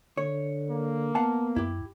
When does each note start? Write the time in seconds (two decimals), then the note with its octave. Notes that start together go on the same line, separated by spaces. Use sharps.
0.17 D3 C#5
0.70 A#3
1.15 B3 F5 F#5 A5
1.56 F#2 E4 G4